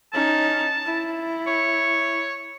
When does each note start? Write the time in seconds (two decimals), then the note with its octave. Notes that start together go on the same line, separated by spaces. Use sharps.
0.13 C#4 D#4 A5
0.85 E4
1.47 C#5